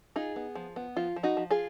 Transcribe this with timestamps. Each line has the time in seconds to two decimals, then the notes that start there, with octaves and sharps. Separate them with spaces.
0.16 D#4 F4 G#4
0.36 B3
0.55 F3
0.76 B3
0.97 F3 F4
1.16 F3
1.23 D#4 F#4
1.37 F3
1.51 F4 G#4